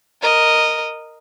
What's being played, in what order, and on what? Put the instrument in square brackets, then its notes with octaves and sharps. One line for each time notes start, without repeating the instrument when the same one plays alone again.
[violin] A#4 D#5